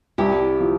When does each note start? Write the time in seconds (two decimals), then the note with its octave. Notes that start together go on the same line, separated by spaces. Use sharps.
0.18 C2 E4 G4
0.60 F3